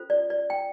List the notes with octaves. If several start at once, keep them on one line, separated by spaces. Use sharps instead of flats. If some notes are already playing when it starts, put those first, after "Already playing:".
Already playing: C#4 F4 A4 C5
D5
D5
G5